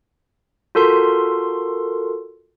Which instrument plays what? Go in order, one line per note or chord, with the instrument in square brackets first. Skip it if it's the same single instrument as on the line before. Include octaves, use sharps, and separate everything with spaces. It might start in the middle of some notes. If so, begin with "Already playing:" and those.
[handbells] F4 F#4 A4 A#4 C6